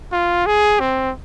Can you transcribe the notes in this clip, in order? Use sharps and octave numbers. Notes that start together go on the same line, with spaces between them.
F4
G#4
C4